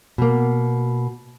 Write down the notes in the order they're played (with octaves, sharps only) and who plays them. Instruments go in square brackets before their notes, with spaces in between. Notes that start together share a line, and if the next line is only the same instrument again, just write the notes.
[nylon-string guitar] B2 A#3